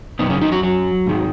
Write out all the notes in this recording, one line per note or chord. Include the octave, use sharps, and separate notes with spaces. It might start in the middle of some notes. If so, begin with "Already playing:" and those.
F#2 B2 D#3 B3
C#3 C#4
D#3 D#4
F#3 F#4
F#3
G#2 D#3